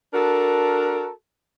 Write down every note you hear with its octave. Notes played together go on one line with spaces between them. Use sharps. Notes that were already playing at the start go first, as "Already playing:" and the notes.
D4 F#4 A4 A#4